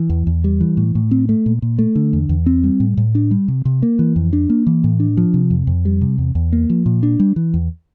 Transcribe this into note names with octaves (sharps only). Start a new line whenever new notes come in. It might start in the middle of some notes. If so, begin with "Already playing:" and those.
Already playing: E3
E2
E2
G3
E3
A2
A2
C4
A3
A#2
A#2
A3
D3
E2
E2
C4
G3
A2
A2
D4
G3
C3
C3
A#3
E3
F2
D4
A#3
E3
A2
D4
F3
C3
F2
F2
G3
C3
E2
E2
A#3
F3
A#2
D4
G3
E3
E2